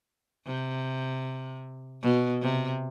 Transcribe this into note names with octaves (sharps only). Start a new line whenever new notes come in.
C3
B2
C3